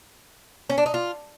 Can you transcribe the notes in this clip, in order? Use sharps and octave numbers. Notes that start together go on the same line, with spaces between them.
C#4
D4
D#4
F4